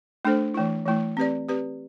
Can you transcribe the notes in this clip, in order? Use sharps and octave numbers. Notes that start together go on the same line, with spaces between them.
A3 D4 A4 C5
E3 A3 E4
E3 A3 E4
C4 G4 B4 D5
C4 G4 B4 D5